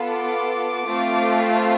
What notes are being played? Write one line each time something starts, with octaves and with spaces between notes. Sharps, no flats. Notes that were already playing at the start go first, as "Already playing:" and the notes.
Already playing: B3 F4 A4
D6
A3 C4 F4